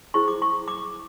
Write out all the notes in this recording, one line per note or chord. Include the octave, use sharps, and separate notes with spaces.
E4 G#4 C5 C#6
D6
C#6
D6